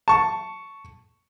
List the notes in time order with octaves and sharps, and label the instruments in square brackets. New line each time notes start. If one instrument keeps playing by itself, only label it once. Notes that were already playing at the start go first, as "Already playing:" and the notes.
[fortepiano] A5 C#6